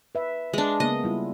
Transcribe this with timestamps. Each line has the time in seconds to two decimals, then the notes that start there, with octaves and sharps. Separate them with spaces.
0.15 B4 E5
0.53 G#3 D4
0.80 C#3 A#3 B3 D#5
1.04 G3 E4 F4